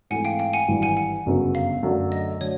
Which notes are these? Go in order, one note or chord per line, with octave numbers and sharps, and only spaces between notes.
G#2 E3 A3 C4 F#5 G#5
F5 G5
F5 G5
F#5 G#5
G#1 G2 E3
F#5 G#5
F#5
G1 F#2 C#3 F#3 B3
F5
F#2 D3 F#3 A3
D#5
D3 F#3 A3 C#5